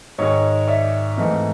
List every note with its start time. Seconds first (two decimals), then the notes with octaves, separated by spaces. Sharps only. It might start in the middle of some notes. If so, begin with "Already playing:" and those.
0.18 G#2 D#3 G#3 C#5 D#5
0.68 D5 E5
1.17 G#2 E3 A3 C4 D#5 F5